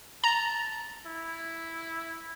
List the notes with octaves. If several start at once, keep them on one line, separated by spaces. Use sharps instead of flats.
A5 A#5
E4